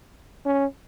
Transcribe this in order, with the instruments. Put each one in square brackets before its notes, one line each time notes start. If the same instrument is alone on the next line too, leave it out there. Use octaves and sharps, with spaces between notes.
[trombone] C#4